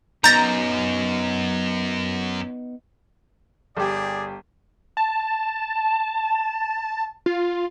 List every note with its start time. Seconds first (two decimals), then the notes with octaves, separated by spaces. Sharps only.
0.24 F#2 B3 D#4 A#5 G6 A6 A#6
3.77 G1 G4 G#4 D5
4.97 A5
7.26 F4